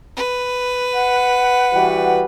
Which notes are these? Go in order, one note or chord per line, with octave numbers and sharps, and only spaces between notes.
B4
F#5
E3 G3 F#4